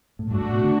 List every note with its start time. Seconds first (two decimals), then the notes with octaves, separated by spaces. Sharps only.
0.19 A2
0.30 G2 A3 D4 F#4
0.42 A2
0.53 B2
0.64 D3